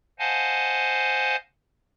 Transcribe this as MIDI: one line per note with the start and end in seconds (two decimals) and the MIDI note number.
0.19 1.36 72
0.19 1.36 75
0.19 1.36 77
0.19 1.36 78
0.19 1.36 80
0.19 1.36 81